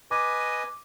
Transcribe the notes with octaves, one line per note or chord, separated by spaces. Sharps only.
B4 D#5 G#5 D6